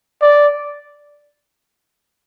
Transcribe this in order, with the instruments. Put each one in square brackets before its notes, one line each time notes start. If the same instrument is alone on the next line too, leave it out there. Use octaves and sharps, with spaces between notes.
[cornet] D5